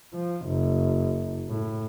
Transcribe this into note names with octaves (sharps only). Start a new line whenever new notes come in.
F3
F#1
A2